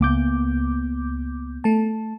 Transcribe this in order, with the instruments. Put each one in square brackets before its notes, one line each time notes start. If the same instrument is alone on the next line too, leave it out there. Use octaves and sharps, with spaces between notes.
[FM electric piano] C#2 D6 G6 [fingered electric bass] A#3 B3
[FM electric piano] A3 A5